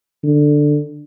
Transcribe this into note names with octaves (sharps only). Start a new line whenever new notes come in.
D3